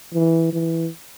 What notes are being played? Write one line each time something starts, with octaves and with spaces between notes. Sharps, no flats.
E3
E3